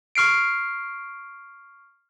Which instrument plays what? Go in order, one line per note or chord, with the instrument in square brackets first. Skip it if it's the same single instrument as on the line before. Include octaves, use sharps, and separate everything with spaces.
[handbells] C#6 F6 C7 D7